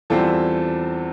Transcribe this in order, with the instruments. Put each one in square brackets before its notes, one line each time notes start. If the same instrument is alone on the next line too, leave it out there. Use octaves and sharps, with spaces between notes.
[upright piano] E2 E3 G3 C4 F4 A4